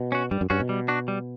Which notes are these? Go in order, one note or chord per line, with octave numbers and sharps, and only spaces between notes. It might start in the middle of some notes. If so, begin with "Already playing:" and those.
Already playing: B2
C#4 F#4
G2 G3
F#2
G2 C#4 F#4
B2
G3
D4 F#4
G3